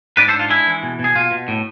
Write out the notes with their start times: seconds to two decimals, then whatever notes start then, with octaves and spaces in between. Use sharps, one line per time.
0.17 G#2 B4 D5
0.28 A4 C5
0.34 D4
0.39 F4
0.50 G#3 E4
0.67 E3
0.83 B2
0.99 B2 G#4
1.15 B2 F4
1.31 B2
1.48 A2